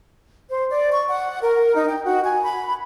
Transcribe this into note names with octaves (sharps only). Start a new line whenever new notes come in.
C5
D5
C#6
F#5
A#4
D#4
G5
F#4
G#5
B5